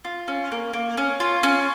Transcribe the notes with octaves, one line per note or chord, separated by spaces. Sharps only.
F4
C#4
A#3
A#3
C#4
F4
C#4